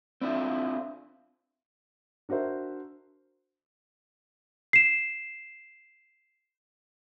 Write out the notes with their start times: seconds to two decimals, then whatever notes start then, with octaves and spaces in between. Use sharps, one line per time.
0.21 C4 D4 E4 F4
2.29 D4 F#4 A#4 C5 E5
4.73 C7 E7